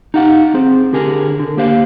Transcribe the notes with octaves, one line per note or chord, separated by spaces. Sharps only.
D#4 G4 F5 F#5
C4 G#4 C5
D3 G4 G#4 A#4
D3
A#3 G4 C5 F5